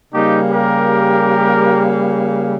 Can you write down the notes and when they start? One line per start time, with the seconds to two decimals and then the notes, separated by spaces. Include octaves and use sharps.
0.12 C#3 G3 A#3 D#4 G4
0.51 G4 A#4